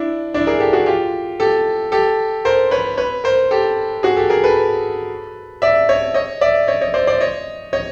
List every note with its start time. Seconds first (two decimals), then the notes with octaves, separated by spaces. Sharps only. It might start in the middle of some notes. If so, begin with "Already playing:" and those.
Already playing: D4 E4
0.34 D4 E4
0.47 G#4 A#4
0.60 G4 A4
0.73 F#4 G#4
0.86 F4 G4
1.40 G4 A4
1.92 G4 A4
2.45 A#4 C5
2.71 B4 C#5
2.97 B4 C#5
3.24 A#4 C5
3.51 G4 A4
4.03 F#4 G#4
4.17 G4 A4
4.30 G#4 A#4
4.44 A4 B4
5.62 D5 E5
5.89 C#5 D#5
6.14 C#5 D#5
6.41 D5 E5
6.67 C#5 D#5
6.81 C#5 D#5
6.94 C5 D5
7.07 C5 D5
7.21 C#5 D#5
7.73 C#5 D#5